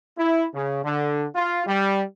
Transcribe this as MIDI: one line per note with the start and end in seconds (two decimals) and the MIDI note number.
0.18 0.45 64
0.54 0.83 49
0.85 1.26 50
1.35 1.62 65
1.67 2.02 55